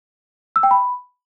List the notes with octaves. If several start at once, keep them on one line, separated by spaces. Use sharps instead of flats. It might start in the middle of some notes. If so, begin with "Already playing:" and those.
E6
G5
B5